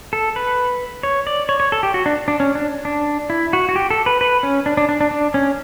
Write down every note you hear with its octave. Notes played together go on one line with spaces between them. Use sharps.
A4
B4
C#5
D5
C#5
C#5
A4
G4
F#4
D4
D4
C#4
D4
D4
E4
F#4
F#4
G4
A4
B4
B4
C#4
D4
D4
D4
D4
D4
C#4